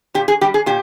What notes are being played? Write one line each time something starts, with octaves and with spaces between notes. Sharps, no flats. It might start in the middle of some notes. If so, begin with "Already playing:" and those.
A#2 G4
G#4
G3 G4
G#4
A#2 G4